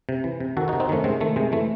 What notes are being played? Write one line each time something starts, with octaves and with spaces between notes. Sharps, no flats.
C3
E3
C3
D#3 F#4 A4
D#4 F#4
C3
C4 D#4
D#3 A3 C#4
C3 G#3 C4
D#3 A3
C3 G#3
E3 A3